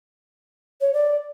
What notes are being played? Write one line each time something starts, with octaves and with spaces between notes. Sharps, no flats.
C#5
D5